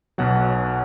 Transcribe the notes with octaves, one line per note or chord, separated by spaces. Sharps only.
B1 B2 F#3 F#5